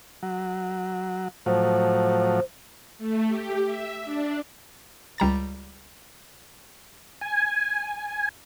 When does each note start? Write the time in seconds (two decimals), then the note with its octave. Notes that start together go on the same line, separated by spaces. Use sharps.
0.23 F#3
1.46 A2 F3 F#3 C5
2.98 A3
3.28 G4
3.66 E5
4.05 D4
5.18 C#2 G3 A#5 A6
7.21 G#5